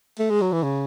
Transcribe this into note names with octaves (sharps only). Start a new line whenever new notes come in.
A3
G#3
F#3
E3
C#3